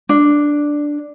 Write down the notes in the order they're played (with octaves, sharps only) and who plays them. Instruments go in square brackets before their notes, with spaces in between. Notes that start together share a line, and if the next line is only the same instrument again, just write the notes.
[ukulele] D4